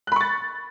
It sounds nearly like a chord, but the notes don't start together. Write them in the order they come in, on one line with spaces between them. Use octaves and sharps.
F#6 B5 C#6 A6